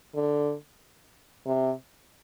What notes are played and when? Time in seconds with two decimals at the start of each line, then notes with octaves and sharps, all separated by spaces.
0.15 D3
1.46 C3